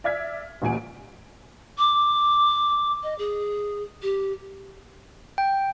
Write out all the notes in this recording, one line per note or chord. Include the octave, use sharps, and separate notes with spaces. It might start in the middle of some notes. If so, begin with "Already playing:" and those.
D5 E5 F6 G#6 B6
A1 D2 A#2 G#5 D7
D6
D#5
G#4
G4
G5